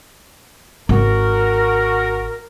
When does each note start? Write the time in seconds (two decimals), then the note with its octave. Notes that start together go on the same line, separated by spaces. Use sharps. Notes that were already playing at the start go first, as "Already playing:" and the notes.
0.89 G#1 F#4 A#4